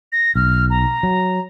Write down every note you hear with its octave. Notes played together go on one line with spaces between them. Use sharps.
A#6
B1 F6
A#5
F#3